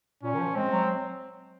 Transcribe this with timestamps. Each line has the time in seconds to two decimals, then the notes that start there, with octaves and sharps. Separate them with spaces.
0.23 A#2 C#4
0.34 D#3
0.39 F3
0.56 G#3 C4
0.71 F#3